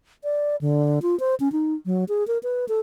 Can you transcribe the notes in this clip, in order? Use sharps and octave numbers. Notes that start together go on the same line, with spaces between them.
D5
D3
F4
C5
C#4
D#4
F#3
G#4
A#4
B4
A4